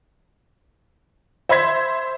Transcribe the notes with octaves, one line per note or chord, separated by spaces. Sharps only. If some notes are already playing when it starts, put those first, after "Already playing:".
C5 E5 B5 C6 G#6 B6